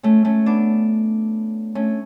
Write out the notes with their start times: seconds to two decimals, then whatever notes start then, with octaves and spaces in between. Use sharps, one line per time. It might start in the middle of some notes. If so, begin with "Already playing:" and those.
0.03 A3 C#4
0.25 A3 C#4
0.46 B3 D4
1.75 A3 C#4